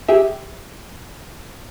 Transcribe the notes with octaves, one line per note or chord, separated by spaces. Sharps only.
G4 G#4 E5